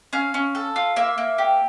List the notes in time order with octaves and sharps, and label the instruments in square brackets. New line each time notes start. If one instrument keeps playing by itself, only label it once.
[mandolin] C#4 F5
C#4
A4
F4
A#3 E5
A#3
G4